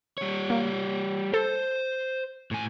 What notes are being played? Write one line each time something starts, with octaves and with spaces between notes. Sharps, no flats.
G3 C#5
A#3
A4 C5
A2 G#5